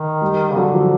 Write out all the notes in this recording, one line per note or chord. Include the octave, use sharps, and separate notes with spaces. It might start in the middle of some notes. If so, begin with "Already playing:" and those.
Already playing: D#3
G3
C#3
D3 F#3
F3